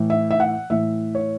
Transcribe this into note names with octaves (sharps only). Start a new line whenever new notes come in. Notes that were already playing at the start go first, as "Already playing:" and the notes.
Already playing: A2 E3
E5
E5
F#5
A2 E3 E5
C#5